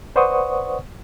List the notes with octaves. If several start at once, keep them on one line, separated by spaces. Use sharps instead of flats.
B4 C5 D5 F#5 C#6 D#6